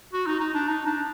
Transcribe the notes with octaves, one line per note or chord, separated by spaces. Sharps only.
F#4
D#4
D#4
D4
D#4
D4